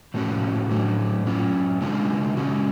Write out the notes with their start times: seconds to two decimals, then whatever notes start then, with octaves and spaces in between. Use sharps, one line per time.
0.14 A2 F3 A3 C#4 F#4
0.70 A2 F#3 A3 D4
1.26 F#3 C#4 F4
1.81 C#3 G#3 D4 F4
2.37 C#3 G#3 C#4 F#4